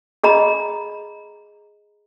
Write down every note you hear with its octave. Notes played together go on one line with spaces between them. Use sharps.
G#4 D#5 A#5 B5